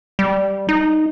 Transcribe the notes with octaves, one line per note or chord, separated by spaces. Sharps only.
G3
D#4